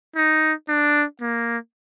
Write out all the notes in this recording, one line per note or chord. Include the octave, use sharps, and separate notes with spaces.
D#4
D4
A#3